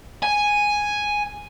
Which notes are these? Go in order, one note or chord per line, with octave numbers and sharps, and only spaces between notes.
G#5